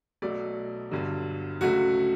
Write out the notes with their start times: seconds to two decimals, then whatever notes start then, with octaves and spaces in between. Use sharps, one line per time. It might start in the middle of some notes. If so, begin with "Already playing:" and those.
0.22 B1 B2 F#3 A3 D5
0.91 G1 G2 D3 F#3
1.61 C#2 C#3 F#3 A3 F#4